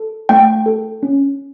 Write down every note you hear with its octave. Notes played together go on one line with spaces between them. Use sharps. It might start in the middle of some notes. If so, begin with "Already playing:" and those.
Already playing: A4
A3 G5
A4
C#4